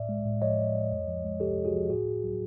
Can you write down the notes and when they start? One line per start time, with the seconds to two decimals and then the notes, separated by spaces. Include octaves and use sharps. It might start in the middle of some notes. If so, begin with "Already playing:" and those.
Already playing: A2 D5 E5
0.09 G#3
0.25 A2
0.42 F3 C#5 D#5
0.58 A2
0.75 G#3
0.92 F2
1.08 F3
1.24 G#3
1.40 C3 G4 A4
1.57 F2
1.65 F#4 G#4
1.73 F3
1.90 A2 F#4 G#4
2.07 A2
2.24 F#3